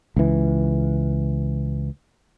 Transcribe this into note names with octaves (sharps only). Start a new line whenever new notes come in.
C#2 E3